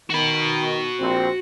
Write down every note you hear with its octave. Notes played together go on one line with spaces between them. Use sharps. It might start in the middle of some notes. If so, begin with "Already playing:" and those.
D#3 F#4 B5
A#1 C4